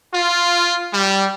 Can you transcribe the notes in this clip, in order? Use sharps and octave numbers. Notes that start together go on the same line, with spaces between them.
F4
G3